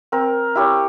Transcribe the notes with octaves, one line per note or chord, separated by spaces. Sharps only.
C4 A#4
E4 G4 C#5